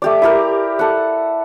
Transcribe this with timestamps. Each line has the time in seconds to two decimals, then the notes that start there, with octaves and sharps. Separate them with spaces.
0.02 A3 G4 D5
0.22 E4 G4 A#4
0.79 A4 F#5